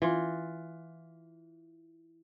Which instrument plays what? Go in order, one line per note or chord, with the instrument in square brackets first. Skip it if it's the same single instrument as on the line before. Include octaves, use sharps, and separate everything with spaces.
[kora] E3 F4